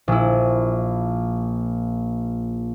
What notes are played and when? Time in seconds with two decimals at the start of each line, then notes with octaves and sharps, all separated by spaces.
0.08 A#1 E4